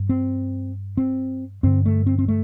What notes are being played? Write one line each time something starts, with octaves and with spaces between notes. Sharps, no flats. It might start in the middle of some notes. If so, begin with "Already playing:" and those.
Already playing: G2
C4
C4
G2 D3 C4
A3
C4
C4
A3